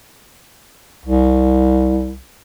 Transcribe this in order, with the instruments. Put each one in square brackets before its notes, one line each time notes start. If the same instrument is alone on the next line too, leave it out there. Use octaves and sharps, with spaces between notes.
[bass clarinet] C2